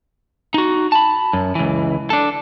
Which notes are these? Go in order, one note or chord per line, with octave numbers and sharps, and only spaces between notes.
D#4 F#4
A5 B5
F#2
C#2 E3
D4 A4